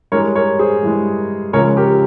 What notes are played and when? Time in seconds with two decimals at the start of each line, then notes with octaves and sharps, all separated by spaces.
0.12 G2 E3 G#3 A#4 C#5
0.35 A#4 C#5
0.59 G#4 C5
0.83 G2 E3 G#3
1.53 C#2 C#3 F3 G#3 A#4 C#5
1.77 G4 A#4